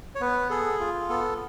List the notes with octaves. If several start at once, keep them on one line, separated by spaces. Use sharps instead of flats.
C#5
B3 B4
G#4 A4
F4
B3 A4